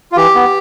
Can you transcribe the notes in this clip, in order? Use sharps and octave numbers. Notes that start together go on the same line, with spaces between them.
F4
E3 G4
B3